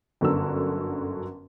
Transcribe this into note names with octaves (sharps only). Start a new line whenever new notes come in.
G1 F#2 D3 F#4 A#4 E6